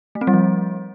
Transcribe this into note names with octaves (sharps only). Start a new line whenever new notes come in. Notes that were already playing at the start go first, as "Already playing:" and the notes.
A3
C4
G3
F3